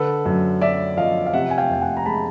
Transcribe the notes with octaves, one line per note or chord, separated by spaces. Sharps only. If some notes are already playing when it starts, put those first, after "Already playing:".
Already playing: D3 A4 B4
F#2
F#2 D5 E5
F3 D#5 F5
F5
C3 E5 F#5
G#5
F5 G5
F2 G5
F#5 G#5
A#5
G#3 A5 B5